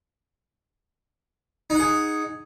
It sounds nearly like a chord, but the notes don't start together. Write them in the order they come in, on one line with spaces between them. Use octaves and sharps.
D#4 F#5 G#4